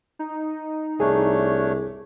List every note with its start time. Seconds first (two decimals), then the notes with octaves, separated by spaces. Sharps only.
0.19 D#4
1.00 C2 A3 D4 G#4 C#5